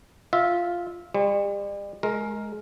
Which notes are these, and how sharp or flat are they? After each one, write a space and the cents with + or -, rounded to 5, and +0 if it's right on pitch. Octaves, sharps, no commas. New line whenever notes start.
F4 +0 E5 -15
G3 +40 C#5 -45
G#3 +25 A#4 +0